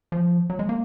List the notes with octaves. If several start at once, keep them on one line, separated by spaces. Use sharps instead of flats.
F3
F#3
G#3
A#3